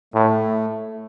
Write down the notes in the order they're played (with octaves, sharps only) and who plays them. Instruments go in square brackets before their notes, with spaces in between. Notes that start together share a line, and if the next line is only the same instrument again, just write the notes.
[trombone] A2 [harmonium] A3